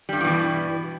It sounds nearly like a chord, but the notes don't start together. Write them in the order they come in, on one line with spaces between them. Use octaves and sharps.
G3 G2 D3 E3 B2